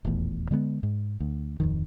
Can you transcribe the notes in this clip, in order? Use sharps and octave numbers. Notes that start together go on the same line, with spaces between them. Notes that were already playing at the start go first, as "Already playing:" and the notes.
D#1 A1 E2 A2
D3 G#3 A#3 B3
G#2
D2
D1 F2 D#3